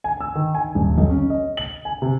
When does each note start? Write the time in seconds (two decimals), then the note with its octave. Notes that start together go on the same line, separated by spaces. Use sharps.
0.04 G#5
0.21 E6
0.35 D#3
0.55 G#5
0.75 D#1
0.98 B1
1.10 C#4
1.30 D#5
1.57 F#7
1.85 G#5
2.02 C3